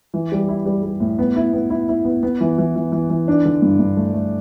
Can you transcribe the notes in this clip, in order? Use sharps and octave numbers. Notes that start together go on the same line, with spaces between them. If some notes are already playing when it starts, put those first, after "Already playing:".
E3
G3
E4
G3
G3
A2
B3
E4
B3
E4
E4
B3
B3
E3
E3
E3
E3
E3
D4
D3
G2
G2
A3
A3